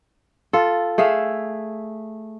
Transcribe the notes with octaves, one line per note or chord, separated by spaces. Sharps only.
F4 A4
A3 G#4 E5 F5